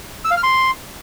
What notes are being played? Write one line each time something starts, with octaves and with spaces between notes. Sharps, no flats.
E6
F5
F6
C6